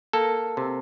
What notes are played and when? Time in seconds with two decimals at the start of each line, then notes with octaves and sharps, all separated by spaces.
0.13 A#3 A4
0.57 C3